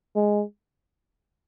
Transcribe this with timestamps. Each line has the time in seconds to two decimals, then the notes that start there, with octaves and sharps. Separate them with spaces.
0.15 G#3